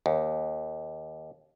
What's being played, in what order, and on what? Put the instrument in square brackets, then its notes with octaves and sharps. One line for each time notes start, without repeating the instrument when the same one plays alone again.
[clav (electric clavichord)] D#2